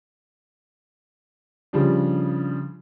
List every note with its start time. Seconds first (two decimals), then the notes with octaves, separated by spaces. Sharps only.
1.73 C#3 F3 G3 D4